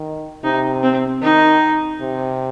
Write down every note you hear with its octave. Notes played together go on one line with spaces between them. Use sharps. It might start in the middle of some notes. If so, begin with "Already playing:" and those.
Already playing: D#3
C3 D#4
C4
D#3 D#4
C3